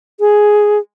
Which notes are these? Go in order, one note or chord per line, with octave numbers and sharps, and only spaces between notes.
G#4